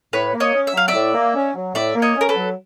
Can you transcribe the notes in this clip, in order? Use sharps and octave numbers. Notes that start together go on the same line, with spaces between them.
A2 B4 C#5
A#3
C#5 D#5
C#4
E5
F#3 F5
D5 E5
A2
A#3
C#4
F#3
A2 D5 E5
A#3
C#5 D#5
C#4 A#4
A4 B4
F#3